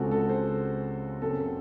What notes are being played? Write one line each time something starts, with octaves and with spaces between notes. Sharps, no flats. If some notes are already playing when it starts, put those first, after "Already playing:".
Already playing: C#2 C#3 G#3 C4 F#4 A4
A4
C5
F#1 F#2 C#3 F#3 C4 A4